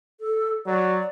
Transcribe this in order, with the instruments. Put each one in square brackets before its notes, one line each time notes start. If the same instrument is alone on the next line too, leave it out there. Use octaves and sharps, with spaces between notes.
[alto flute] A4
[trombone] F#3 [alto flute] D5